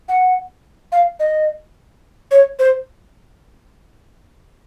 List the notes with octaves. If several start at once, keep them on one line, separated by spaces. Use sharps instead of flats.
F#5
F5
D#5
C#5
C5